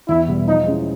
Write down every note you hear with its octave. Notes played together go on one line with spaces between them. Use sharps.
E2 E4
B2 G3
F3 D#4
G#3 C#4 E4